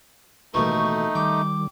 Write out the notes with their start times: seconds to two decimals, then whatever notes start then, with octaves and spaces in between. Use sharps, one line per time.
0.54 A1 D#2 B2 A3 D#4 C#6
1.15 D#3 G3 G5 D6